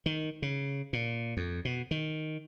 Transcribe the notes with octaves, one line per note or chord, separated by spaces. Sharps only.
D#3
C#3
A#2
F2
B2
D#3